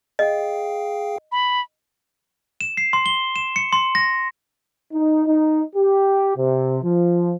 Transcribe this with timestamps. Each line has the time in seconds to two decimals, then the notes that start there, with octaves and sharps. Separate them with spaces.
0.19 G#4 D#5 F5 G5
1.32 B5
2.61 E7
2.77 C7
2.93 C6
3.06 G7
3.36 E7
3.56 C#7
3.73 C6
3.95 A#6
4.93 D#4
5.26 D#4
5.75 G4
6.36 C3
6.83 F3